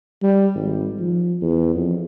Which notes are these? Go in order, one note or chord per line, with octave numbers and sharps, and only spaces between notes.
G3
G#1
F3
E2
F2